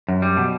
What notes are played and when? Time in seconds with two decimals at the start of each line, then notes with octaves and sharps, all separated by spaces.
0.08 F#2
0.22 G3
0.37 B2